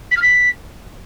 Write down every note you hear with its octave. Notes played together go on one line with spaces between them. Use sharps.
B6
F6
B6